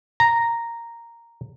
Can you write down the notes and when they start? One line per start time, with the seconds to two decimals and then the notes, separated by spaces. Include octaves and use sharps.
0.20 A#5